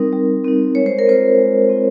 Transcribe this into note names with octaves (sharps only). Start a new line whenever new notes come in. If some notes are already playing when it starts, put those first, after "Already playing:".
Already playing: G3 C4 D#4 A#4
G3
C4 D#4
G#3 C#5
C5
A#4
C4 F4 C5
G#3
C4 F4